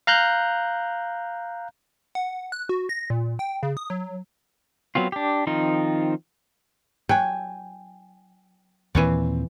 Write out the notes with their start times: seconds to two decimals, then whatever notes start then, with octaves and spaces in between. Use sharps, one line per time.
0.07 F5 A#5 F#6 G6
2.15 F#5
2.52 F#6
2.69 F#4
2.89 A#6
3.10 A#2
3.39 G5
3.63 C#3
3.77 D#6
3.90 F#3
4.95 F#3 B3 C4 F4
5.12 D4 G4
5.47 D#3 F3 C4 D#4 F4
7.09 F#3 G5 G#5
8.95 D#2 A#2 E3 C4 C#5 D5